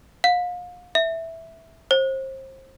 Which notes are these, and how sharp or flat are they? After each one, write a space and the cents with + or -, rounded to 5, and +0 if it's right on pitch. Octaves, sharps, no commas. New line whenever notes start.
F5 +35
E5 -5
C5 +30